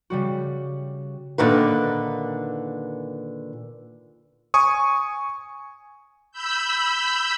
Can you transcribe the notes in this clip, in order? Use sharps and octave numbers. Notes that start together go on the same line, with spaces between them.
C#3 G3 F#4
A#2 D3 D#3 B4
G#5 C#6 D#6
B5 E6 G6